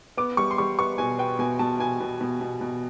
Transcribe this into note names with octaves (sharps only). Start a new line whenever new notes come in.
B3 D6
G3 C#6
C6
G3 C#6
B3 C#6
B2 G#5
B3 G5
B2 G#5
B2 A5
B2 G#5
B2
B2
B2
B2